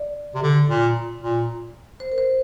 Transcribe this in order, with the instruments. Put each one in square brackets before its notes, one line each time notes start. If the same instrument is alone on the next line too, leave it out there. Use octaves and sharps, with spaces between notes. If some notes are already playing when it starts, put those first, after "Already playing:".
Already playing: [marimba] D5
[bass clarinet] C3
D3
A#2
A#2
[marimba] C5
A#4
C5